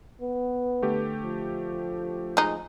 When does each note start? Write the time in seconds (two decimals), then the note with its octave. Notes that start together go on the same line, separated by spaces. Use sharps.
0.21 B3
0.82 D3 A3 G4
1.24 F3
2.37 G#3 D#4